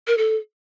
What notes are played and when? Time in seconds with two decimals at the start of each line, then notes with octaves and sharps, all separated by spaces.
0.08 A#4
0.18 A4